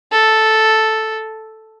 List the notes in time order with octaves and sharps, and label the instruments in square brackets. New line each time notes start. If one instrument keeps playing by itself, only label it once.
[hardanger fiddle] A4